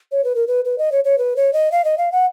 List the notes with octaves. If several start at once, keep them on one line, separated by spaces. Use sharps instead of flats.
C#5
B4
A#4
B4
B4
D#5
C#5
C#5
B4
C#5
D#5
F5
D#5
F5
F#5